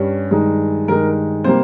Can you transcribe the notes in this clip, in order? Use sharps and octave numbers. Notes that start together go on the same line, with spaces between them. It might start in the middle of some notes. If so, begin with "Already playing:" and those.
Already playing: G2 G3 C#4
G2 D#3 G#3 D#4
G2 D#3 G#3 D#4 A#4
C3 G3 A#3 C5